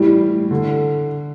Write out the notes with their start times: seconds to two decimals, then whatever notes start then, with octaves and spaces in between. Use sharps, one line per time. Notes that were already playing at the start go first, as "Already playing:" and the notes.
Already playing: A2 E3 G3
0.51 D3